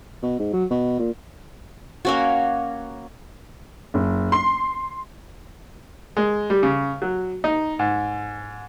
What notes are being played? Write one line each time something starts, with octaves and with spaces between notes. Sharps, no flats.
B2
G#2
F#3
B2
A#2
A#3 C#4 F#4
F#1
C6
G#3
G3
C#3
F#3
D#4
G#2